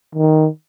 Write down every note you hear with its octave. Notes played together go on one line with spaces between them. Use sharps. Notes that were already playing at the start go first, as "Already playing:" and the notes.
D#3